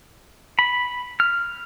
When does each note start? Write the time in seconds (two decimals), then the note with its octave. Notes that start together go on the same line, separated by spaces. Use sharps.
0.59 B5
1.20 F6